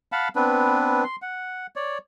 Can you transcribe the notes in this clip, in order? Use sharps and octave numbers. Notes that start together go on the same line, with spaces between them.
F5 F#5 A5 B5
B3 C4 D4 B4
C6
F#5
C#5 D5